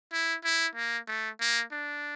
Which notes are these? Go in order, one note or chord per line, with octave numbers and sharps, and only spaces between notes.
E4
E4
A#3
A3
A#3
D4